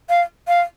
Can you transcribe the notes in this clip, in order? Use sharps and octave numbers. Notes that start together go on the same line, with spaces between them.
F5
F5